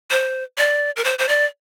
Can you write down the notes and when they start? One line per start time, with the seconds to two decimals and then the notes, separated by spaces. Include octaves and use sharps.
0.11 C5
0.58 D5
0.96 A#4
1.04 C5
1.19 C5
1.28 D5